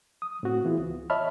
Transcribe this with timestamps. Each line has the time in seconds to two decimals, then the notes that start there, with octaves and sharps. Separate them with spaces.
0.22 D#6
0.43 A2 C4 F#4
0.65 E3 B3 E4 F4 G#4
0.78 C#2
1.10 C#5 D#5 E5 A5 B5 F6